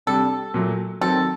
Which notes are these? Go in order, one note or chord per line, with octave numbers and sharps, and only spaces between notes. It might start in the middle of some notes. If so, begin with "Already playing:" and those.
C3 G3 D4 A4
A#2 F#3 A3
D#3 F#3 C4 A4